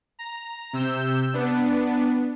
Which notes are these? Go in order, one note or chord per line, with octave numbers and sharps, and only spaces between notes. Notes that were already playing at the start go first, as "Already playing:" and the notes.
A#5
C3 E6 G6
B3 D4